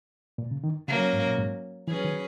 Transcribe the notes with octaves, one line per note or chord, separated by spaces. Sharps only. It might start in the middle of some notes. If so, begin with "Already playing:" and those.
A#2
C#3
D#3
C#3 F#3 A#3 C#4
G#2
A#2
G#2
E3 F#3 C#4 G#4 B4
D#3